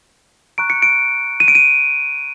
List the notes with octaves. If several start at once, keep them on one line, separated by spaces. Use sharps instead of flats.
A#5 C#6 F#6 D7
C#7
D7
D#7
D7
D#7